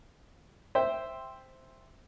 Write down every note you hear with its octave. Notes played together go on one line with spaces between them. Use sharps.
C5 E5 G5